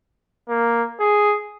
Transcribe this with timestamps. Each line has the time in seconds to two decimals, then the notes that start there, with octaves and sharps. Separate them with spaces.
0.49 A#3
1.00 G#4